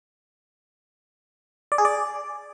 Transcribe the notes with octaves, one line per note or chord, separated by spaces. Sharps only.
D5
G#4
D5